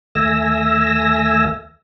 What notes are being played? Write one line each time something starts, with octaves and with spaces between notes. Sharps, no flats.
D#2 A3 E5 G#5 E6 A#6